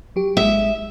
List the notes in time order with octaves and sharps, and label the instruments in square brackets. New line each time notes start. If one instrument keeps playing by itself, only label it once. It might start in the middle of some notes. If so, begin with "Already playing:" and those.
[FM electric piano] F#3 G4
[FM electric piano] G#1 G#3 [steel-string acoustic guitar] E5